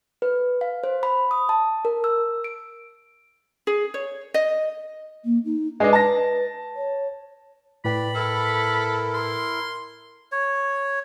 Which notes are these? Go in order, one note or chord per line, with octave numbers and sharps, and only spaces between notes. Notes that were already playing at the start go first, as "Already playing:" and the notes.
B4
F5
C5
B5
D#6
A5
A#4
E6
D7
G#4
C#5
D#5
A#3
D#4
G#3 D4 B4 D#5
A5 A#6
C#5
A2 B4 D5 G5 B5
E4 A4 A#4
C6
C#5